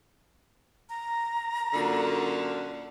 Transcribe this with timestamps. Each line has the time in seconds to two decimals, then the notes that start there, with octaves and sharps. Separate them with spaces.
0.89 A#5
1.74 F#2 A#2 D3